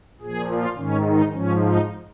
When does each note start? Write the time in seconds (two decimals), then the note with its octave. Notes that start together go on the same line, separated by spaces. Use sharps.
0.21 A#2 F3 G#4
0.50 F4
0.77 G#2 D#3 C#4
1.05 D#4
1.32 G#2 F3 C#4
1.61 D#4